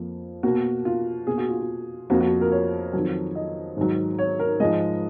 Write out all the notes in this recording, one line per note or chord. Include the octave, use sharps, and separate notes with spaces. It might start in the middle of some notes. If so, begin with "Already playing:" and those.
Already playing: F2 F3 A#3
B2 A#3 F#4
F4
B2 A#3 G#4
F#4
F4
F#4
F2 F3 A#3 F#4
F#4
A#4
C#5
F2 D#3 F#3
D#5
G#2 D#3 F#3
C#5
A#4
G#2 F3 G#3 D#5